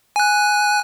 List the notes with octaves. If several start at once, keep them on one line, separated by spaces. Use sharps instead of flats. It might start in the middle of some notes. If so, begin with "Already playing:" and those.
G#5 F#6